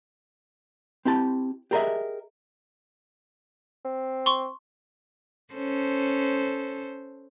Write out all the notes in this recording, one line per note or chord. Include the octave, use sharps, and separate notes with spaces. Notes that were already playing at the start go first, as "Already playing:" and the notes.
C4 E4 G4 A5
G4 G#4 A#4 C#5 D#5 E5
C4
C6 C#6
C#4 A4 C5